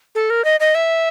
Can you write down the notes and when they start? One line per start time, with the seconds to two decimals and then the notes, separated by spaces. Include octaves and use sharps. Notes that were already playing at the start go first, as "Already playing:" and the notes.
0.15 A4
0.30 A#4
0.45 D#5
0.60 D#5
0.75 E5